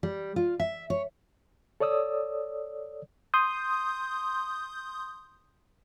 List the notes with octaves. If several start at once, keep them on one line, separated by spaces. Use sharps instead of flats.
G3
F4
E5
C#5
A4 C#5 D5 D#6 E6
C6 D#6 G6